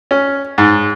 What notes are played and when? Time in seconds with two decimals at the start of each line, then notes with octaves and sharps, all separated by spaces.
0.11 C#4
0.58 G#2